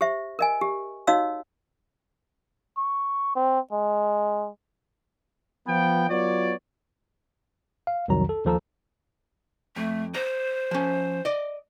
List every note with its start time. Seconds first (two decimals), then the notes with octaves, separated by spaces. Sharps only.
0.01 G4 C5 E5
0.39 A#4 D#5 G#5
0.61 G4
1.07 D#4 F#4 C#5 D#5 F5 E6
2.78 C#6
3.36 C4
3.73 G#3
5.67 F3 B3 G5
6.10 F#3 B3 F4 C#5 D5
7.87 F5
8.08 C2 F2 D#3 F#3 A#5
8.29 A4
8.45 D#2 F3 A4 A#5 E6
9.76 F2 A3
10.14 C5 A#5
10.71 F3 C#4
11.25 D5 D#5